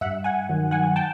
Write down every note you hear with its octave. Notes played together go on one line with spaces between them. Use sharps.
G2 E5 F#5
F#5 G#5
D#3 F#3
F#5 G#5
G5 A5